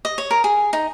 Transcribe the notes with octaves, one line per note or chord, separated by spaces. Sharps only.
D#5
C#5
A#4
G#4
D#4